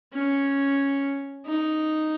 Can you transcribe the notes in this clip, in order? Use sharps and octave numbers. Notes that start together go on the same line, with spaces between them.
C#4
D#4